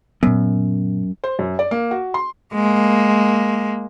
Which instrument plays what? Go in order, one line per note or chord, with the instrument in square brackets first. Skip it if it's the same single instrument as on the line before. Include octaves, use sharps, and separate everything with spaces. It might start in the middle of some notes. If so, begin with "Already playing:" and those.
[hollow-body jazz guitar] F#2 [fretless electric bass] A#2 B3
[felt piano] C5
F#2
D5
A#3
F#4
C6
[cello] G#3 A#3